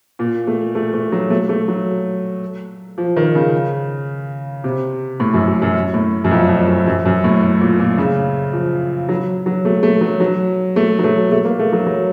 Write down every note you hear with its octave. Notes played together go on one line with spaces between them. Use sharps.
A#2
A3
A3
A3
F#3
A3
A3
F#3
F3
D#3
C#3
C3
A2
F#2
F#2
F#2
A2
F#2
F2
F2
F#2
F#2
F#2
A2
A2
A#2
A#2
C#3
F3
F#3
F#3
A3
A3
F#3
F#3
A3
F#3
A3
A3
A#3
A3
F#3
F#3